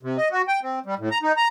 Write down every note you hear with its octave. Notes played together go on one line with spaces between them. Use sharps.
C3
D#5
F#4
G5
C4
G3
A2
A#5
D#4
A#5